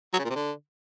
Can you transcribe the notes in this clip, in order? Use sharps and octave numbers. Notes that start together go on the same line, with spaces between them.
F#3
C#3
A#2
C3
D3